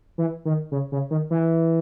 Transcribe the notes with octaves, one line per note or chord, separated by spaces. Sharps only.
E3
D#3
C#3
C#3
D#3
E3